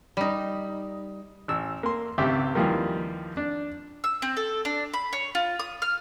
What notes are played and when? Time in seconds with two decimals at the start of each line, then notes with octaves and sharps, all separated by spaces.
0.17 G3 D#4
1.48 A1 E6
1.83 A#3 C6
2.18 G#1 C#2 C4 G4 E5 D6
2.55 D#2 E3 F3 G3 A#3
3.37 D4
4.04 E6
4.22 C4
4.37 A4
4.65 D4
4.94 B5
5.13 C#5
5.35 F4
5.59 D#6
5.82 F6